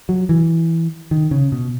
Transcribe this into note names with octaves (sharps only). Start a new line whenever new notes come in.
F#3
E3
D#3
C#3
B2